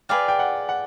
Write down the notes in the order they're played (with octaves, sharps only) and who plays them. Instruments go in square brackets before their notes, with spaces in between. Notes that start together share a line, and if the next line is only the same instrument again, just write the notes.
[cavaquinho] G#4 B4 D5 F5 [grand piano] G5
[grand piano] G5
F#5
F#5